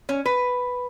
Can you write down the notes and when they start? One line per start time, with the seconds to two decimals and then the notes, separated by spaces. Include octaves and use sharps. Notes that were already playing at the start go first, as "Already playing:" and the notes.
0.09 C#4
0.26 B4